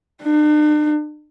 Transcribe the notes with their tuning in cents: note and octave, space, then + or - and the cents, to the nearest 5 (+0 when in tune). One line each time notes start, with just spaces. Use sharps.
D4 +45